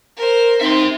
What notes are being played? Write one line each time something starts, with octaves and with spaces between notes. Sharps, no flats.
A#4 C5
C4 D#4 E5 C6